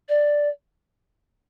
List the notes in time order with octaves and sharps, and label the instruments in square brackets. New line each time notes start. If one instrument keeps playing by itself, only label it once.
[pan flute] D5